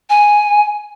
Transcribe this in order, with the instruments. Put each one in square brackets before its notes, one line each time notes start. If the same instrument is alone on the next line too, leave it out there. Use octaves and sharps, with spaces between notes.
[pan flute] G#5